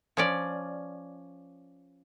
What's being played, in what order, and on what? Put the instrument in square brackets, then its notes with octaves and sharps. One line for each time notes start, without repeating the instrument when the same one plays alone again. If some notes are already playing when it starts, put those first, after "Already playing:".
[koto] F3 C#4 D5